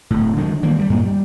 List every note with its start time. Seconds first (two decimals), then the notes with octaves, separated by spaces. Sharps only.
0.10 D1 A2
0.37 D3 D#3 F#3 G#3
0.62 D#3 E3 G3 A#3
0.77 G2 E3 G3
0.90 G2 A#2 G#3
1.05 G3